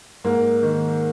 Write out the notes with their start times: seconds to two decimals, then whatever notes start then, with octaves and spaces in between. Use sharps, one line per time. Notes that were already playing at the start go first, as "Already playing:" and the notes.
0.24 G#2 A#3
0.63 D#3